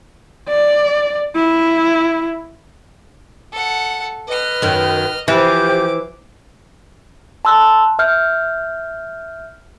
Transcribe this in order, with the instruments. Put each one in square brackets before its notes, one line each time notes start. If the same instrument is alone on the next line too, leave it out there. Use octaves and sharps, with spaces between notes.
[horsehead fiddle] D5
E4
[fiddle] A4 F#5
[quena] B4 [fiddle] D#5 F6
[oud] F#2 D#3
[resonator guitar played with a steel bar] E3 [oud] F3 [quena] G4 [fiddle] D6
[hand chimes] A5 C6 E6 F#6
E5 F6 G6